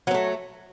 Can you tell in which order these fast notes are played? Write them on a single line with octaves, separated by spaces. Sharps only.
F#3 C4 A3